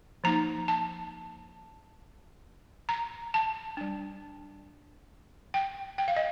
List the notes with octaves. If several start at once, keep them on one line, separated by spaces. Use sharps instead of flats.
F3 A#3 D#4 A#5
A5
A#5
A5
G3 D4
G5
G5
F5
D#5